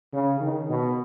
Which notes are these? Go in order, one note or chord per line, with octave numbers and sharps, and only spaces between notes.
C#3
D#3
B2